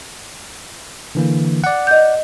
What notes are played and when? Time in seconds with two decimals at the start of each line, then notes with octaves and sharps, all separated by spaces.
1.15 D3 E3 A#3
1.64 D5 F#5
1.87 D#5 G6